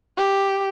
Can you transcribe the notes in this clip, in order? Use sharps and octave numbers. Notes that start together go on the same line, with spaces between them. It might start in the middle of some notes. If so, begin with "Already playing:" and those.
G4